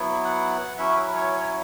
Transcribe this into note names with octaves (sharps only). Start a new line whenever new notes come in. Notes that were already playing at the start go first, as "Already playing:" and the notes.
Already playing: F#3 B3 E4
F#5
F#3 C#4 E4 E5
B4
C#5
C#5